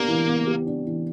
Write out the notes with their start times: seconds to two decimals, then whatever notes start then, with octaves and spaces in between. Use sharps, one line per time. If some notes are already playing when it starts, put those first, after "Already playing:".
Already playing: A#3 B3 D4 G4
0.08 E3
0.28 B3
0.47 G4
0.66 D4
0.85 E3